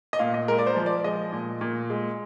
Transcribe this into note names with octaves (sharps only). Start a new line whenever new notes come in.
D#5
A#2 F5
D#5
G#3 A#4
D5
C5
F3
D5
G#3 D#5
A#2
A#2
G#3